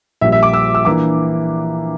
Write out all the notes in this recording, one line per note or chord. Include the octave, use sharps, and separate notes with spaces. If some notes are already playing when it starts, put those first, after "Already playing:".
A#1 A#2 G3 E5
E5
D6
E6
E6
E3 A#3 D4 D6